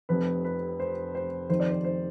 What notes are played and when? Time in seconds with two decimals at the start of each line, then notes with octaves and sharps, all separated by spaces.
0.09 F1 F2 C3 B4
0.45 B4
0.80 C5
1.15 C5
1.50 F1 F2 D#3 C5
1.60 D5
1.70 C5
1.84 C5